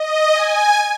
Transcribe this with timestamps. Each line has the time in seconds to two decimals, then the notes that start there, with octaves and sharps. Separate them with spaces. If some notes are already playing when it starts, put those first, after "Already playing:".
Already playing: D#5
0.33 G#5